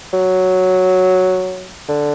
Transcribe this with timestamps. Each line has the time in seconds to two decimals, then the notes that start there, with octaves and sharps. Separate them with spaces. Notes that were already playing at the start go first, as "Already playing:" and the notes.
0.13 F#3
1.89 D3